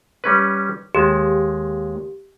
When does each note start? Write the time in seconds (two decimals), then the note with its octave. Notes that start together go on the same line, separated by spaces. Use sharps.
0.24 G3 C#4 B4
0.95 D#2 G#3 G4